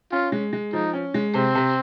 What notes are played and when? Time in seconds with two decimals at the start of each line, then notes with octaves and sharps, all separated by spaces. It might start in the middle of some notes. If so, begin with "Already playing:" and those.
0.11 C#4 F4
0.32 G#3
0.53 G#3
0.73 F3 D#4
0.93 C#4
1.14 G#3
1.34 C3 C4
1.55 C3